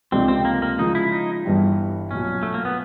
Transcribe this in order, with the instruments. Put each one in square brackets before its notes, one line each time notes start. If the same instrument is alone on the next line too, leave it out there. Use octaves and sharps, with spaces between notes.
[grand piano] C#2 C3 F3 A3 D4 [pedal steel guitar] C4
[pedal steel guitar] C4
A#3
A#3
[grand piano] C#3 F3 G#3 [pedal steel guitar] D#4
[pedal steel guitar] E4
D#4
[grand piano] G1 G2 E3 G3
[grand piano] B1 A#2 F#3 [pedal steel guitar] C#4
[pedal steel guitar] A3
A#3
B3